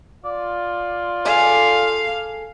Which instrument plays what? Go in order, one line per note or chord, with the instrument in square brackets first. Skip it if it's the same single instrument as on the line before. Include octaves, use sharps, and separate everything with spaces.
[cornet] F4 [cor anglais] D5
[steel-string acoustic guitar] G#4 A4 G#5 [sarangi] F5